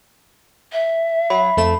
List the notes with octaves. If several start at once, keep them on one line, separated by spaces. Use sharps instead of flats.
E5
F#3 B5 C7
F2 A3 E7